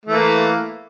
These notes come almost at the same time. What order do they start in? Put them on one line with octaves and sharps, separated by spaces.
A3 E3 A#3